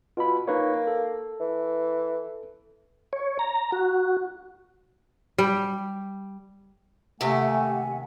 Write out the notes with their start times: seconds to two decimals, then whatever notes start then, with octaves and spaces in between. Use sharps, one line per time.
0.17 B2 F4 B5
0.48 A#3 D#4 B4 C#5
0.87 A4
1.40 E3
3.13 C#5
3.39 A#5
3.72 F#4
5.38 G3
7.21 D#2 C3 A3 G4 F#5 G#5